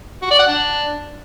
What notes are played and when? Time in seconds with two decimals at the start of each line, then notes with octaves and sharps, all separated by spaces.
0.22 F#4
0.30 D5
0.39 F#5
0.47 D4